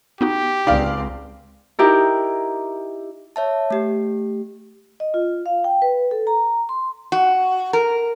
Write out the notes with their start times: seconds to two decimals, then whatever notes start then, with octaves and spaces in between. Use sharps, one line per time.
0.21 B3 D#4 F#4 G4
0.67 C#2 C4 D#4 D5 F5
1.79 D#4 E4 G4 A#4
3.36 C#5 E5 A5
3.70 A3 G4
5.00 D#5
5.14 F4
5.46 F5
5.64 G5
5.82 B4
6.11 A4
6.27 A#5
6.69 C6
7.12 F#4
7.73 A#4